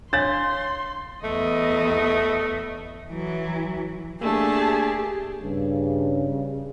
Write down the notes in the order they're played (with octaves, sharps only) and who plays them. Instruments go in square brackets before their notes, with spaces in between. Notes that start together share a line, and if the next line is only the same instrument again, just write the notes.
[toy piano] D4 C#5 F5 [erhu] C6 [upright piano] A6
[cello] E2 D#5 [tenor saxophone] A3
[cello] E3 F#3
[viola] A3 A5 [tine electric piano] A#3 D4 [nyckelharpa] G4 [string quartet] G#4
[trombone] G2 [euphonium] C#3